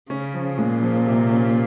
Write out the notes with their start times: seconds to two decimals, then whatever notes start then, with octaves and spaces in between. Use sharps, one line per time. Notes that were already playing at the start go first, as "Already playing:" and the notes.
0.10 C#3 C#4
0.34 F3
0.58 A#2 G#3
0.83 F3
1.06 C3
1.31 C#4